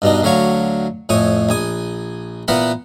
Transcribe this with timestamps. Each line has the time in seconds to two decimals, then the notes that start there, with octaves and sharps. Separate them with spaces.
0.02 G2 B2 D4 D#4
0.23 D2 D3 F#3 C#5 F5 C#6
1.09 F2 A2 C#5 G#5 D#6
1.49 A#1 G#5 D#6
2.48 A#2 E3 B3 A#4 F#5 B5